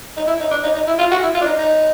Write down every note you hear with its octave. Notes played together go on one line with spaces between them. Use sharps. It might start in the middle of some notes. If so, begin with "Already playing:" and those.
D#4
E4
D#4
D4
D#4
D#4
E4
F4
F#4
E4
F4
D4
D#4
D#4